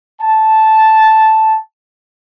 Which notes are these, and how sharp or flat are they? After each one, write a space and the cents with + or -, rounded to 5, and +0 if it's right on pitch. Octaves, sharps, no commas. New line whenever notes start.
A5 -5